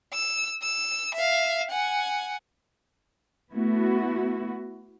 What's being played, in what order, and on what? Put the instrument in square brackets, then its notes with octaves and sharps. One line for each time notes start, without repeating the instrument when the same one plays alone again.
[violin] E6
E6
E5 F5
F#5 G#5
[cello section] A3 B3 E4 F#4